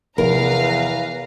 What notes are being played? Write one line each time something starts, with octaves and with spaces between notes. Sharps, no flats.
E2 C3 F3 A#4 B4 F5 A#5